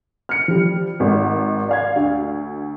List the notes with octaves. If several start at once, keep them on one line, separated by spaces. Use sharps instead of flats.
F6 C#7
F3 G3
G#1 G#2
D5 F5 G#6
D2